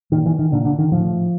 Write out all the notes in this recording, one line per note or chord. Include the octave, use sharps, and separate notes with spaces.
A#2 D#3
E3
D#3
A#2 D3
D3
D#3
A2 F3